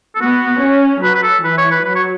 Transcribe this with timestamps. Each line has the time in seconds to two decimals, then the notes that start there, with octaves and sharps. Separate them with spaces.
0.15 A4
0.21 B3 F#4
0.62 C#4
1.03 F#3 B4
1.15 B4
1.23 A4
1.44 E3 B4
1.58 C#5
1.71 B4
1.85 F#3 B4
1.95 C#5